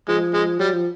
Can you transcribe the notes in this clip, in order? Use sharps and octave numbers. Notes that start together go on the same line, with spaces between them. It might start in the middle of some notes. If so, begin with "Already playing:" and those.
F3 G#3
G#3
F#3 G3
F3